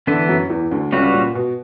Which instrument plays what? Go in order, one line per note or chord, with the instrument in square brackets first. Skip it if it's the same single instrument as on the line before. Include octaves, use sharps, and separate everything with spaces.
[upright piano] D3 D4 [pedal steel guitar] E3 B3 E4 B4
[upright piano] F#2 F#3
E2 E3
D2 D3
[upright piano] C#2 C#3 [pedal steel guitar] G3 C#4 F#4 B4
[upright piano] A#2
B2